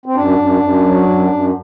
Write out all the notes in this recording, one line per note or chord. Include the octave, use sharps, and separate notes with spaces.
C4
F#2 D4
F#2
F#2
F#3
F#2
F#2